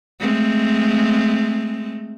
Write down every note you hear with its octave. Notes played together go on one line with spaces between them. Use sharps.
G#3 A3 C4